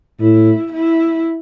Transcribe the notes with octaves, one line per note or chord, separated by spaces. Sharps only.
A2 E4
E4